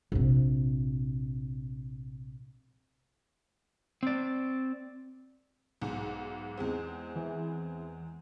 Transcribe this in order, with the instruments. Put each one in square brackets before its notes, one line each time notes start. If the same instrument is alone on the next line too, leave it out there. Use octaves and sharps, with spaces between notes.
[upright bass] A#1 C3
[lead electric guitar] C4 D5
[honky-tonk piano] B1 G#2
E2 G#3 C4
[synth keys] E3